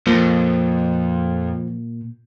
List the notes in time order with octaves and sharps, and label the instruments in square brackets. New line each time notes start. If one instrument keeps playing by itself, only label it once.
[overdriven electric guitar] F2 [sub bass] A#2 [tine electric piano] F3 [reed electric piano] A#3